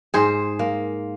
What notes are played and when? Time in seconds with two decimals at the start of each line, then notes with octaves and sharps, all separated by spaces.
0.14 G#2 G#4 C5
0.59 A#3